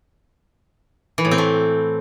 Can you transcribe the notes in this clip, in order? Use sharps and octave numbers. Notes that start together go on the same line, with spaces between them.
E3
A2
C4
A3